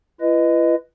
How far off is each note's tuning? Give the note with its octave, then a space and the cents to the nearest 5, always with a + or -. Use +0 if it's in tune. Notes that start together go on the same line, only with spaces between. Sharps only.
E4 +45 B4 +0 D#5 +0